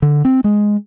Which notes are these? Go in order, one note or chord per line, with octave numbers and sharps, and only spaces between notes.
D3
C4
G#3